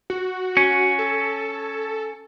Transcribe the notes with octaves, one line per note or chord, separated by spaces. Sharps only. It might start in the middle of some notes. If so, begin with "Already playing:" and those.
F#4
C#4
A4